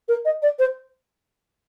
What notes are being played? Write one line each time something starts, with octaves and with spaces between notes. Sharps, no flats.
A#4
D#5
D5
C5